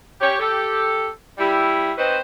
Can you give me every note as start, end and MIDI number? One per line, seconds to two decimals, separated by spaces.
0.21 0.39 67
0.21 0.39 73
0.39 1.07 67
0.39 1.07 69
1.38 1.91 55
1.38 1.91 64
1.96 2.18 60
1.96 2.18 63
1.96 2.18 66
1.96 2.18 71
1.96 2.18 72